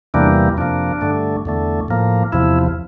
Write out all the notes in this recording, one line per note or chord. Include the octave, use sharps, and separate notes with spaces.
E2 C3 E3 G3 A#3 D4
F2 C3 F3 A#3 D4
G2 D3 A3
E2 D3 A3
A2 F3 A#3
E2 C3 F3 E4